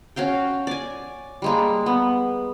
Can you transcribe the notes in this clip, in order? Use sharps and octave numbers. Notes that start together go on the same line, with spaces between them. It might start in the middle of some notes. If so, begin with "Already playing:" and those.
C#4 F#4 F5 G5
D5 G#5
G3 G#3 A#3
B3